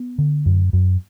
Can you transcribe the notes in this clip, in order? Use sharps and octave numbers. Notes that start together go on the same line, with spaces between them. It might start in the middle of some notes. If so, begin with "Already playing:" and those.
Already playing: B3
D3
F#2
F#2